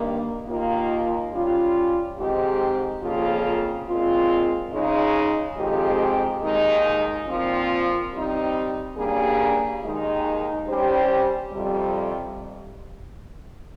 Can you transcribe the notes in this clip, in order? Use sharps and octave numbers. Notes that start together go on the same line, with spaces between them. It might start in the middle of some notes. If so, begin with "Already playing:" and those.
Already playing: G2 D#3 A#3
D#2 D#3 A#3 F4
G3 C#4 F4
G#2 D#3 G#3 C4 G4
F2 C#3 F3 A#3 F4
A#2 G#3 C4 F4
C#3 G#3 D#4
F2 D#3 G#3 C4 G4
D#2 D#3 G#3 D#4
A#2 F3 C4 F4
G3 C4 D#4
G2 G3 A#3 C#4 G#4
D#2 D#3 G#3 D#4
G3 C#4 G4 C5
F2 C3 G3